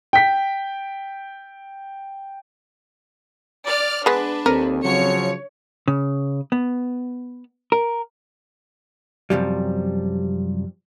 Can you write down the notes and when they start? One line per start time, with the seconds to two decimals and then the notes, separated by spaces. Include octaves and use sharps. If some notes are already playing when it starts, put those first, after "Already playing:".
0.13 G5 B6
3.67 D5 F6
4.06 G#3 B3 D4 B4
4.46 D#2 C4 A4 A#4
4.84 C#3 F3 F#3 C#5 C#7
5.88 C#3
6.52 B3
7.72 A#4
9.30 F#2 C3 F3 G3